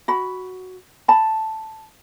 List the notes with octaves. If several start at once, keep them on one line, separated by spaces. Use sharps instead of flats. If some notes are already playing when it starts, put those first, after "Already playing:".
F#4 B5
A5 B5